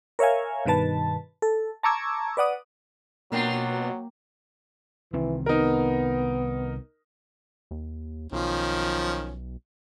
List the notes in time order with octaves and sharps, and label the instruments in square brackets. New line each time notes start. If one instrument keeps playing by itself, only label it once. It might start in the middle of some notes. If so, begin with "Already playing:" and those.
[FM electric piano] A#4 C#5 E5 F5 G#5
G2 B2 D#3 B4 A5
A4
A5 A#5 C#6 D6 E6 G#6
B4 D5 F#5 D#6
[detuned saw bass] B2 [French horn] F#3 [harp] A#3 A#4 G5 [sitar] B3 D4 F4
[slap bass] C2 D#3 C4 [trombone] E3
[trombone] B3 [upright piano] D#4 A#4
[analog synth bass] D#2
[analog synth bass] B1 [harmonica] D#3 F3 C#4